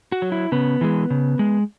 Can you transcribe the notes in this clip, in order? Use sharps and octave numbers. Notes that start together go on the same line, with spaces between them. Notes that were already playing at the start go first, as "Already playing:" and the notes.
F#4
F#3
E4
C#3 B3
E3 G#3
C#3
G#3